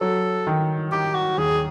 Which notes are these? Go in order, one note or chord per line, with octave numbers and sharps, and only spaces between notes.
F#3 A4
D#3
D#3 G4
F#4
D#2 G#4